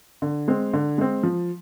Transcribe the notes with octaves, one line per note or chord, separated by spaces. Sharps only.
D3
G#3 C4
D3
G#3 C4
F3